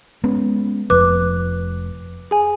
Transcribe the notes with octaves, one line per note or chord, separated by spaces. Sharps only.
G#3 B3 C#4
F1 F2 B4 D6 F#6
G#4 G#5